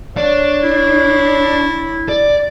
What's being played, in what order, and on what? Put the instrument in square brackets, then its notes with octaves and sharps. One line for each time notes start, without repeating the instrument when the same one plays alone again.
[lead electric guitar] D4 [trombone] C#5
[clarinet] E4
[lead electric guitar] D5